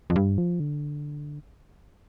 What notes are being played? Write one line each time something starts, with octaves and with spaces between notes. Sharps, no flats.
F2
G2
F3
D3